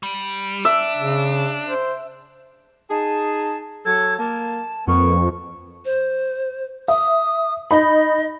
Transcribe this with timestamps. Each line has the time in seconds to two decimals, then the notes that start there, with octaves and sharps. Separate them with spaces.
0.03 G3
0.65 D4 E5
0.98 C#3
1.68 C5
2.90 D#4 G#4 A5
3.85 F#3 A4 G#6
4.18 A#3 A5
4.88 F2 A#3 B3 C#6
5.85 C5
6.88 E5 D#6
7.71 D#4 D#5 B5